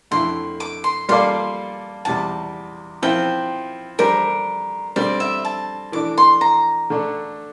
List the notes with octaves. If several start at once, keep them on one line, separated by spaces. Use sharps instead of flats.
F2 D3 A3 E4 C6
D6
C6
G3 A#3 F4 A4 D5 C6
E2 C3 G3 A5
F3 C4 E4 G5
D3 G3 D4 G4 A#4 C5
D3 G3 C4 D5
E5
A5
E3 A3 D4 D6
C6
A#5
D3 A3 D4